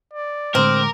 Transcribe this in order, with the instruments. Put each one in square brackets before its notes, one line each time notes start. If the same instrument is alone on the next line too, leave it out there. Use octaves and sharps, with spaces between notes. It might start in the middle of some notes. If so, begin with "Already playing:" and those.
[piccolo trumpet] D5
[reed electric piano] A2 D3 G#3 [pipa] C4 [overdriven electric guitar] A#4 [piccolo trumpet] D6